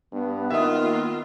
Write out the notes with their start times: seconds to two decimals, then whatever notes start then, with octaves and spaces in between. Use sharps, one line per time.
0.12 G2 B3
0.50 D#3 A#3 F4 A#4 E5 D#6